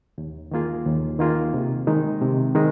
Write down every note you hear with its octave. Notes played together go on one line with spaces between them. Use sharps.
D#2
D#3 A#3 F4 G#4
D#2
D#3 A#3 F4 G#4
C3
D#3 G#3 D#4
C3
D#3 G#3